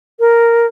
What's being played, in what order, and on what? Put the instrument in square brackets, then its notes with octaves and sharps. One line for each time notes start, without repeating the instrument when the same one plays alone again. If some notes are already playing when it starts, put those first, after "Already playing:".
[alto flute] A#4